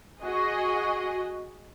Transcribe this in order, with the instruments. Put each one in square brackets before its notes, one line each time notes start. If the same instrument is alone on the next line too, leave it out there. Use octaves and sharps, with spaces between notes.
[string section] F#4 G#4 D#5